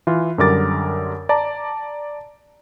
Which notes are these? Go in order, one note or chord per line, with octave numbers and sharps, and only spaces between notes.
E3 F4
F#2 D3 G3 A#4 D6 A6
D5 A5 A#5